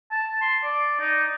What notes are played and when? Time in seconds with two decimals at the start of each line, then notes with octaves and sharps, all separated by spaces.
0.11 A5
0.41 C6
0.64 D5
1.00 D#4